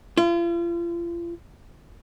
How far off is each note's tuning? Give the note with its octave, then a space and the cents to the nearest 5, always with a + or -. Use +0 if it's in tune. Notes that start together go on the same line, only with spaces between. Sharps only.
F4 -40